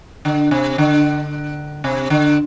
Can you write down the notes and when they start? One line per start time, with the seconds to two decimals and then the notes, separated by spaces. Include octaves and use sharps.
0.25 D3
0.51 C3
0.78 D3
1.84 C3
2.10 D3